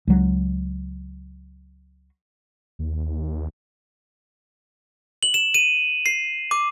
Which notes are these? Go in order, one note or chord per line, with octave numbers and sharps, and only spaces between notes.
C#2 F#3
D#2
F#7
E7
D#7
C7
D6